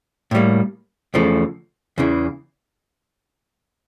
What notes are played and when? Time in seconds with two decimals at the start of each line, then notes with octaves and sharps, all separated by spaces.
0.31 A2 G3 A#3
1.14 E2 C#3 F3 A3
1.98 E2 C#3 E3